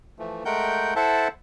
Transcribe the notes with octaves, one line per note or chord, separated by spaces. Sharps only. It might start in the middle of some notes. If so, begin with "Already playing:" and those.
E3 F3 A3
G#3 A3 A#4 F#5 G5 G6
E4 A4 C5 E5 F#5 A5